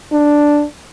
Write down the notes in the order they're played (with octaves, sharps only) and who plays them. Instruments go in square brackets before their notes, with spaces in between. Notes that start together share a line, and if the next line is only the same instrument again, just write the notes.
[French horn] D4